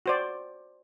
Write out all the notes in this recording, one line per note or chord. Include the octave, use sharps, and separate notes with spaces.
F#4 C5 D5